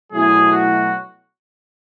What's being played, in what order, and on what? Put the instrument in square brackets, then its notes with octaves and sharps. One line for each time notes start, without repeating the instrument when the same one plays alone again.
[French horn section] B2 F#3 A3 E4 [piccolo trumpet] G#4
[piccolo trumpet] F#4